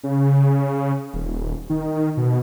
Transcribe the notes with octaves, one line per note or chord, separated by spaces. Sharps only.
C#3
C#3
D#1
D#3
B2